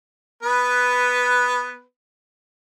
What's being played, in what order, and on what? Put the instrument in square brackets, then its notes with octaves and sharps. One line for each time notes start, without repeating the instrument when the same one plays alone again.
[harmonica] B3 B4